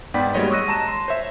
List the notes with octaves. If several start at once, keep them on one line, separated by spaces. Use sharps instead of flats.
G#2 B3 D5 G5 B5 B6
G3 G#3 A#3 F#4 C#5 D#5
C#6 D#6 E6 F#6 A#6 D#7
A5 A#5 A#6 E7
C6
C5 C#5 E5